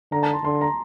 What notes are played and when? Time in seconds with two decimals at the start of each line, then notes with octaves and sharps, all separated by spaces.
0.12 D3 A#5
0.23 A5
0.33 C6
0.44 D3 C6
0.61 A#5